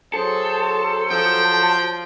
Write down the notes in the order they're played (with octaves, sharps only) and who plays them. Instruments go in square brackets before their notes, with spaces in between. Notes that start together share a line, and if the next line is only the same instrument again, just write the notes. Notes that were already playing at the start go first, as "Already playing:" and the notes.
[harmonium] F#3 C5 [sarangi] G#4 [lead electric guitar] A4
[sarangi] F3 [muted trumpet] G5